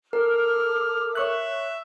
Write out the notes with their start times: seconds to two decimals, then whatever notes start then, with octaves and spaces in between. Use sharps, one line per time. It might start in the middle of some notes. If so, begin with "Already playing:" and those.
0.13 A4 A#4 D6 E6 F6
1.15 C#5 E5 C#6 F#6